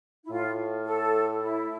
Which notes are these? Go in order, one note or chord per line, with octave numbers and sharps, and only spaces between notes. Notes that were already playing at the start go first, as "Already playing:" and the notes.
E4
A2 F4
A4
E4